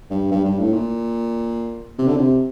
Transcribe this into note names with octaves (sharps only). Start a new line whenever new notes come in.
G2
G2
G2
A2
A#2
C3
D3
C3